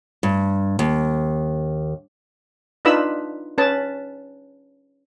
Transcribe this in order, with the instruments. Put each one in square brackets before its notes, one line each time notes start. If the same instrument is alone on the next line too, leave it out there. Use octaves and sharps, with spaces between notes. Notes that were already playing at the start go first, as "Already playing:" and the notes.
[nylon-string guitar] G2
D#2
[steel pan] D4 D#4 F4 B4 B5 E6
C#4 B4 A5